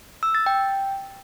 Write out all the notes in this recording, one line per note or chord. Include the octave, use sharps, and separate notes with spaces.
E6
A6
G5